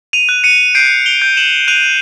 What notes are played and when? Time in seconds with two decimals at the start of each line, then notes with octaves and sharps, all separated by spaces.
0.13 D#7 F7
0.29 F#6
0.44 C#7 D#7
0.75 G6 C7 D7
1.06 F7 G7
1.22 G6
1.37 E7 F#7
1.68 F#6 D#7 F7